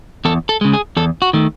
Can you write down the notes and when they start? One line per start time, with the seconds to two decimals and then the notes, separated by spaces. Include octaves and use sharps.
0.25 E2 A4
0.49 A4
0.61 C#3 G#3
0.73 G#4
0.97 E2 A4
1.22 F#4
1.33 D#3 A3